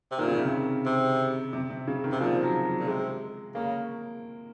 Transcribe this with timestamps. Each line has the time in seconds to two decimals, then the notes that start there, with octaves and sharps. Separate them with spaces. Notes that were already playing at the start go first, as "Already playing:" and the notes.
0.11 C3
0.18 A#2 D#3
0.28 C#3
0.37 C3
0.47 C#3
0.86 C3
1.53 C3
1.70 C3
1.87 C#3
2.04 D#3
2.12 C3
2.20 A#2 F3
2.43 F#3
2.65 F#3
2.79 A#2
2.87 C3 G#3
3.55 C#3 A#3